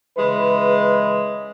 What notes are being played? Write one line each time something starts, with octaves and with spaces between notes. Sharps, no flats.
C#3 E3 G#3 B4